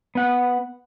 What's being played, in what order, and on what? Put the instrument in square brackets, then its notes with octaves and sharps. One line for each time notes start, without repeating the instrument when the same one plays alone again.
[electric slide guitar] B3 F#5